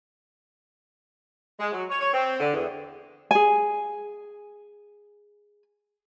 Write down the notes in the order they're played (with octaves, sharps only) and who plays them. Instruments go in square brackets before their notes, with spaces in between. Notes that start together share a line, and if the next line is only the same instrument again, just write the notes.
[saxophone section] G#3
F#3
C#5
C#5
C4
D3
E2
[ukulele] G#4 G#5